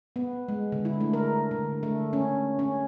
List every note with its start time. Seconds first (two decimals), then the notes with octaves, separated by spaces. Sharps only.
0.16 B3
0.48 G#3
0.72 D3
0.85 E4
1.01 A3
1.13 A#4
1.51 D3
1.83 A3
2.13 C#4
2.59 C#4